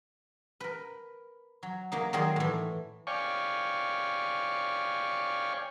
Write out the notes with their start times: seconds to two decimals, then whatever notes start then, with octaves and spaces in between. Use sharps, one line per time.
0.60 A#4 B4
1.63 F#3
1.92 F#3 A#3 D#4
2.13 D#3 F#3 G#4 D5 C6
2.36 A2 E3
3.07 C#5 D5 F5 G5 G#5 C#6